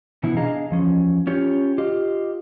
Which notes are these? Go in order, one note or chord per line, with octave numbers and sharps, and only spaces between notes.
B2 E3 B3 E4
D4 G#4 D#5 F5 A#5
E2 F3 C#4
C#4 F4 G4 C#5
F4 G4 D#5